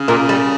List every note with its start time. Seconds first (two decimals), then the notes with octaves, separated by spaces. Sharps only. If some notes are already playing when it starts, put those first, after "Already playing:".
Already playing: C#3
0.08 A#2 A#3
0.29 G3